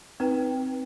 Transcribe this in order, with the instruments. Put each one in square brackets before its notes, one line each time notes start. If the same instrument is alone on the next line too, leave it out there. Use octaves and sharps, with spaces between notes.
[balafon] C4 D#4 B4 G5